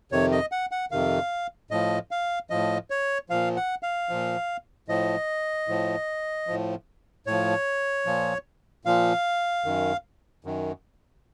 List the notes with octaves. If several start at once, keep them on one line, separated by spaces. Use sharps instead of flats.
F2 C3 D#3 C#5
D#5
F#5
F#5
F2 C3 D#3 F5
A2 F3 D#5
F5
A2 F3 D#5
C#5
A#2 F3 F5
F#5
F5
A#2 F3
A2 F3 D#5
A2 F3
A2 F3
A2 F3 C#5
A#2 F3
A#2 F3 F5
F#2 D#3
F#2 D#3